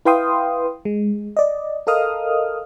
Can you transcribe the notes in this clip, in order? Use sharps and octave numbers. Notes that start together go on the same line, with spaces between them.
E4 B4 F5 G5 C6 D#6
G#3
D5 D#5
A4 A#4 D#5 F5 D#6 F6